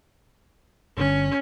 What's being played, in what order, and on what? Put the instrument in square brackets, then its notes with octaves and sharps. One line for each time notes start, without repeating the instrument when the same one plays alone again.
[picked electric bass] G1 A#2 D3 [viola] C#4